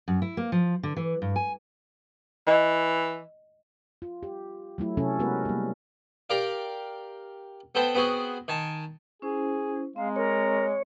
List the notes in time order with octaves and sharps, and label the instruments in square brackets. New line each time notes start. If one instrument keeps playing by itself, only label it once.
[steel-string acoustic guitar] F#2
E4
A#3
F3
D3
E3
G2
G#5
[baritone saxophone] E3 [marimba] D#5
[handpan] F4
G4
F#3 A3 E4
C3 F#3 C#4 A4
G#3 B3 F#4 A#4 B4
G3 A#3
[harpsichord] G4 A#4 D5 F5
B3 A4 C5 G5 A5
B3 C4 F#4 G#4
D#3 G#5 A5
[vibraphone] C#4 E4 C5 [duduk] G#4
[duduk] G#3 [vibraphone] C4 A#5 [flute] F5
[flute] A#4 [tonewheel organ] C#5